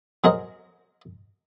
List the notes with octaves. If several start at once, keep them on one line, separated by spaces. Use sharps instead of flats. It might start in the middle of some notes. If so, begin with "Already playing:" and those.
F#3 G#4 A#4 C5 D#5